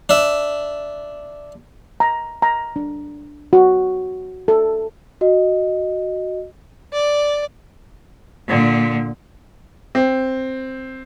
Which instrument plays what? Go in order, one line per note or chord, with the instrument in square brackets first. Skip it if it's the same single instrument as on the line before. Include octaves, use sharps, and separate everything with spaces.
[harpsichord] D4 E5
[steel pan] A#5
A#5
D4
F#4
A4
[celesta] F#4 D#5
[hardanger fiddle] D5
[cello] A#2 D3
[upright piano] C4